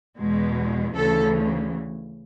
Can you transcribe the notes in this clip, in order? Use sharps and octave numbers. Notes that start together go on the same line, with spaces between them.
E2 B2 G#3
D2 C#3 E3 A4